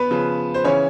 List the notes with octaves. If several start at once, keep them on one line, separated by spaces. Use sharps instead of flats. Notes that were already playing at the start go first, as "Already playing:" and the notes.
Already playing: B3 B4
C#3 F3
C5
C#3 E3 C#4 C#5